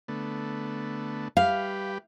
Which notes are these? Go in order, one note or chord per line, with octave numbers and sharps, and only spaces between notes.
D3 A3 B3
G3 G4 B4 F5